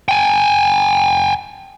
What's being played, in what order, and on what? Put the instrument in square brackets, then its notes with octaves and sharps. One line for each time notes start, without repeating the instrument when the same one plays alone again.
[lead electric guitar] G5 G#5